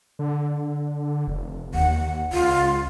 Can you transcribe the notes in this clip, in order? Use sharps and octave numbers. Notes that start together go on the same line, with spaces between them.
D3
F1
D#2 F#5
C#2 F4